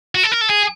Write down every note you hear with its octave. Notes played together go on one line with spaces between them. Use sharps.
F#4
A4
A#4
A4
G#4